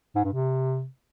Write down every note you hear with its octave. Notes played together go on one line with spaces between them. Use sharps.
G#2
G2
C3